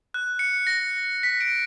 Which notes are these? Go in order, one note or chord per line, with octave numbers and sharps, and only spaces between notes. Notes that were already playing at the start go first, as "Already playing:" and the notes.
F#6
C#7
A#6
B6
D7